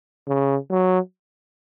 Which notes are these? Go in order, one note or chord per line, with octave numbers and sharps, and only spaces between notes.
C#3
F#3